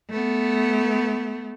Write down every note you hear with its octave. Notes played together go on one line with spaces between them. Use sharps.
A3 B3